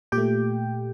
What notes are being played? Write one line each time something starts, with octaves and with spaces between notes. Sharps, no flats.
A#2 G4 G5
A3